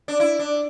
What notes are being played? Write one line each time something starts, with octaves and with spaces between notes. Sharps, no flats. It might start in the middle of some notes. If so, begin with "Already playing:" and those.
D4
E4
D4